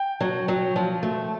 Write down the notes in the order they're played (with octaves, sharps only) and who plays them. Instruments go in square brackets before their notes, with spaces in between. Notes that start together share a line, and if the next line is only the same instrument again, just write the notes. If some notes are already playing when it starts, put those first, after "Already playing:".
Already playing: [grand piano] G5
[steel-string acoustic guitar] F#3
F#3
F3
A3